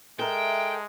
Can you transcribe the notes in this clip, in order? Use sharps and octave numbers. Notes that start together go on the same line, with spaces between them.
G#3 A4 A#4 E5 G5